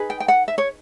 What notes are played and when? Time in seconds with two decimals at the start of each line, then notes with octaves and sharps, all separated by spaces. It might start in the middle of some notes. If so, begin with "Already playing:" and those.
Already playing: D#4 G#4 B4
0.10 G5
0.20 G5
0.28 F#5
0.48 E5
0.58 C#5